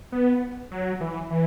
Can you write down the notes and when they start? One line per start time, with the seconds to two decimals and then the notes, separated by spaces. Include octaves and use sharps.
0.12 B3
0.71 F#3
1.01 E3
1.30 E3